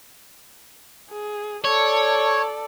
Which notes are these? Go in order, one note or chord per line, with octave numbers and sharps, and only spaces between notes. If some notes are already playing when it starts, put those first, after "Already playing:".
G#4
A4 C#5 D5